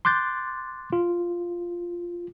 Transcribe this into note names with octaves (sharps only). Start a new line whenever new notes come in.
C6 D6 F#6 G6 A6
F4